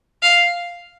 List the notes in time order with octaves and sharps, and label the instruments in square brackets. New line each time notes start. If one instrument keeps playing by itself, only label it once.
[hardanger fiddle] F5